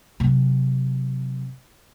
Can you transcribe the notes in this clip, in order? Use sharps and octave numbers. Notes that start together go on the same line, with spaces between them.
C3 F#3